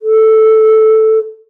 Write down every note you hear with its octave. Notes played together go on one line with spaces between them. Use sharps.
A4